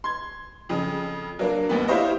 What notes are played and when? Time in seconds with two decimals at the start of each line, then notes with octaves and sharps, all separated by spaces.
0.04 C6 G#6
0.69 F2 C#3
1.39 F#3 A#3 D4
1.69 A1 D#2 B3
1.88 E4 F4 G4 C5 C#5 D#5